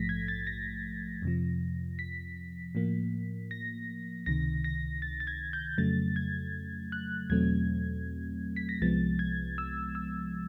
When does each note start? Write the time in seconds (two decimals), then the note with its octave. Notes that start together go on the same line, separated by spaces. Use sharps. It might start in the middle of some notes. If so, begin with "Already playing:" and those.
Already playing: A#1 G#2 F3 A3 A#6 B6
0.09 G#6
0.28 A6
0.47 A#6
1.22 F2 C3 F3
1.99 B6
2.75 A2 F3 A#3
3.51 A#6
4.26 C#2 C3 D#3 A#6
4.64 A#6
5.02 A6
5.20 A6
5.27 G#6
5.53 G6
5.78 F2 C#3 F#3 A3 A6
6.16 G#6
6.92 F#6
7.30 E2 B2 F#3 A3 C4 G#6
8.56 B6
8.69 A#6
8.82 C2 C3 F3 G#3 B3 A6
9.19 G#6
9.58 E6
9.95 E6